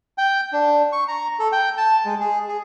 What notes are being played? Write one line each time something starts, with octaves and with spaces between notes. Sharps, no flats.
G5
D4
C#6
A#5
A4
G5
A5
G#3
G#4
G#4